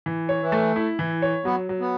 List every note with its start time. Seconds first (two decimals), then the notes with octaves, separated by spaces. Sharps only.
0.06 E3
0.29 C#5
0.41 E3
0.52 A3
0.76 E4
0.99 E3
1.22 C#5
1.45 F#3 B3
1.69 F#3
1.80 B3